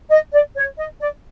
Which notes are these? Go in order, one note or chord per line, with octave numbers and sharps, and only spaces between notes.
D#5
D5
C#5
D#5
D5